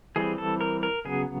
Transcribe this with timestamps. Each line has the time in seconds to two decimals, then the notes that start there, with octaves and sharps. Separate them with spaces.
0.16 E3 G3 C4 G#4
0.38 A4
0.61 A#4
0.83 A#4
1.05 C#3 F#3 B3 G#4